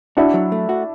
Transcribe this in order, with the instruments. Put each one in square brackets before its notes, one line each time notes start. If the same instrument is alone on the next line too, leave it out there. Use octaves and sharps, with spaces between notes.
[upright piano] D4 E4 [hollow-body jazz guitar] F#4
[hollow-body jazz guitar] F#3
A3
F#4